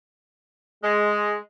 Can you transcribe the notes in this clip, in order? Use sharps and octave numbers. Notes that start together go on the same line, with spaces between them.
G#3